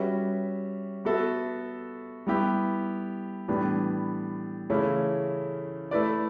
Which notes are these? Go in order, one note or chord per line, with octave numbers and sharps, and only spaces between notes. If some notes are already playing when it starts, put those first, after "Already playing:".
Already playing: G3 C#4 F#4 B4 E5
B3 F#4 A4 E5
G3 B3 E4 G4
A2 E3 G3 B3 D4
C#3 E3 A3 C#4 E4
A3 E4 B4 D5